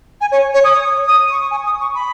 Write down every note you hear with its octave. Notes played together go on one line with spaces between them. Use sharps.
G#5
C#5
C#5
D#6
D#6
C#6
G#5
D#6
C#6
B5